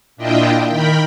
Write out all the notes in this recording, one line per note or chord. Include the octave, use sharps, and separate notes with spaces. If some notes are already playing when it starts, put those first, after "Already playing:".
A#2 D4 E4 F4 D#5 G5
D#3 A#4 G5 B5